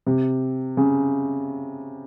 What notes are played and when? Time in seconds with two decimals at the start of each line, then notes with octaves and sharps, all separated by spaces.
0.07 C3
0.77 C#3